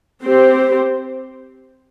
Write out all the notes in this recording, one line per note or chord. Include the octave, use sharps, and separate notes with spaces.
C4 G4 C5